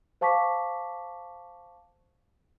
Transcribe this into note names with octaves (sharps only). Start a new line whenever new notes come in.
C5 F5 A5 C#6 D6 B6